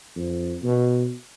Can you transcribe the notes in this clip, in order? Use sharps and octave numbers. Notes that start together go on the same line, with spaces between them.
F2
B2